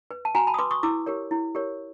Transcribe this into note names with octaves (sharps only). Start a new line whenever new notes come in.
B4
A5
F#4 G#5 A#5
A5 B5
D#6
B4 C6 D6
C#6 D#6
E4 D6 E6
G4 A#4 C#5
E4
G4 A#4 C#5